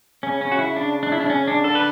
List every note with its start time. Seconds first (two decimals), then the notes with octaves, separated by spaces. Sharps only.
0.23 C#3 C#4
0.41 C#4
0.52 F#4
0.59 E4
0.76 D4
1.03 D4
1.12 E4
1.20 D4
1.30 C#4
1.48 D4
1.64 D3 A4
1.75 B4